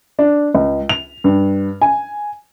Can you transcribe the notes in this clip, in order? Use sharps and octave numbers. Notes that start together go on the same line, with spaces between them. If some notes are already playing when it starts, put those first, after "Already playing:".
D4
C#2
F7
G2
G#5